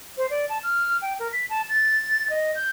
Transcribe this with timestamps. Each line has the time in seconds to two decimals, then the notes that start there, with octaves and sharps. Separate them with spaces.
0.17 C5
0.30 D5
0.49 A5
0.63 F6
1.02 G5
1.19 A#4
1.32 B6
1.49 A5
1.69 A6
2.30 D#5
2.55 G6